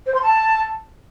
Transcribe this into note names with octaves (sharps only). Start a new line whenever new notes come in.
C5
C6
A5